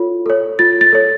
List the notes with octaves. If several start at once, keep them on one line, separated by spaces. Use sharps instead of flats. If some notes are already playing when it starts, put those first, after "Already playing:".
Already playing: F4 A4 C#5
A4 C#5
F4 A6
A6
A4 C#5